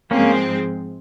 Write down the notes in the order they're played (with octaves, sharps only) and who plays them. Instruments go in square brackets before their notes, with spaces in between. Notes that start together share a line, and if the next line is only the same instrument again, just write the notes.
[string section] G#2 F3 G#3 C4 [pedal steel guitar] A#3 C#4